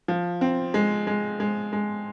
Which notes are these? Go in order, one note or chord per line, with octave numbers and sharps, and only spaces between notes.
F3
C4
G#3
G#3
G#3
G#3